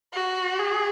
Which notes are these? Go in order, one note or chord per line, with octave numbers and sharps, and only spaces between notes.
F#4
G#4